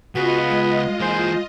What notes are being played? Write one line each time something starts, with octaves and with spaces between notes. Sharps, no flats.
C#2 B3 F4 F#4 G#4 D#5
G#3
E3 A#3 G#4 C5